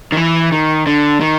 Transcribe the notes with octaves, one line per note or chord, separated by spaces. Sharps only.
D#3
E3
D#3
D3
D#3